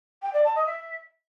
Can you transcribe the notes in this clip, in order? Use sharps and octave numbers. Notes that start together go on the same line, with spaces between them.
G5
D5
A5
D#5
E5